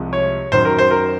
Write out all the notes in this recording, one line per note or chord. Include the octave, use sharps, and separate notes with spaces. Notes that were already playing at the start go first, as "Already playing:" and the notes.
Already playing: C2 C3 F3 G#3
C#5
F#2 D#3 F#3 C5
A#4
C5
A#4